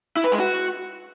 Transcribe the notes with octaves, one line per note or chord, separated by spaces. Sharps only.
E4
B4
G#3
F#4